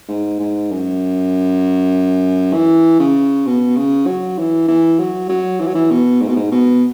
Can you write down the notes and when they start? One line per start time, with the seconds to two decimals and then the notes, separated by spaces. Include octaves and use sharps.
0.09 G#2
0.40 G#2
0.71 F#2
2.54 E3
3.00 C#3
3.47 B2
3.77 C#3
4.07 F#3
4.38 E3
4.68 E3
4.99 F#3
5.29 F#3
5.60 E3
5.67 F#3
5.75 E3
5.91 B2
6.21 G#2
6.29 B2
6.36 G#2
6.52 B2